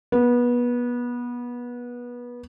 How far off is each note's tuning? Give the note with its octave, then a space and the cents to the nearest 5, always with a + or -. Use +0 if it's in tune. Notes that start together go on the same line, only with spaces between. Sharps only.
B3 -25